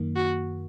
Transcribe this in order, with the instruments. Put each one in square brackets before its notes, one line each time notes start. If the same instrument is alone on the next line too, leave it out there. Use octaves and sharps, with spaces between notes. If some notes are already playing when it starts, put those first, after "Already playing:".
Already playing: [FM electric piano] F#2 D#3 A#3
[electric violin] F#4